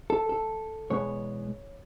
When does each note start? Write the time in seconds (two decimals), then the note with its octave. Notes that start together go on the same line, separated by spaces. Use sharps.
0.10 A4
0.29 A4
0.90 E2 B2 G#3 B3 C#5